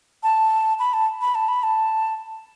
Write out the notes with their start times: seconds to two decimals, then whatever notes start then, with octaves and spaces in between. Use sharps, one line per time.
0.23 A5
0.79 B5
0.93 A5
1.21 B5
1.35 A5
1.48 B5
1.63 A5